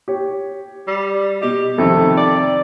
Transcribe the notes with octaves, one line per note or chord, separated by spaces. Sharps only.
G4 C#5
G3
B2 G4 D#5
F2 C3 D#3 A3
D5